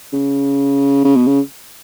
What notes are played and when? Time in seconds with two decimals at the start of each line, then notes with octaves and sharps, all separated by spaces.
0.13 C#3
1.05 C#3
1.16 B2
1.27 C#3